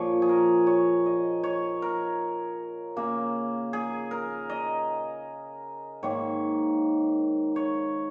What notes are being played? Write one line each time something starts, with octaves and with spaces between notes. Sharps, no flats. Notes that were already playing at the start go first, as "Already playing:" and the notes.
Already playing: A#2 F3 A#3 C#5
G#4
A#4
C#5
D#5
C#5
A#4
C#3 A#3
G#4
A#4
D#5
G#2 D#3 A#3 C#5
C#5